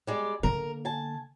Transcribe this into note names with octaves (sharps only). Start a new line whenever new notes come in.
G3 G#3 D5
D3 A#3 A#4
G#5 A5